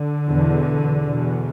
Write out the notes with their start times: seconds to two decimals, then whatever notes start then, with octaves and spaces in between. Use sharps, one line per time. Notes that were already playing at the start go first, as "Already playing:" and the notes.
Already playing: D3
0.28 E2 B2
1.03 E2 B2